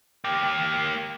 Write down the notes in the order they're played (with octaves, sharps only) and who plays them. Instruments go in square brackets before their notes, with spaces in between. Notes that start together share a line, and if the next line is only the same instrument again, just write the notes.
[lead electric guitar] A#3 G4